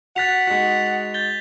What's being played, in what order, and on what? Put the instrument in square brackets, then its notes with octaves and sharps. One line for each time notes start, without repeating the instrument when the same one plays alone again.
[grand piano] F#4 F#6 [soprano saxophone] F#5 [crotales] A6 B6 F7
[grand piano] G#3 D#4 F#4 [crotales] B6
[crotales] G6 A6 G7